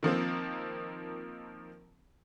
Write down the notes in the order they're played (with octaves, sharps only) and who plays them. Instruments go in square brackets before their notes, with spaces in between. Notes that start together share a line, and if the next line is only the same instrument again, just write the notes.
[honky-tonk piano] D#3 F3 A#3 C4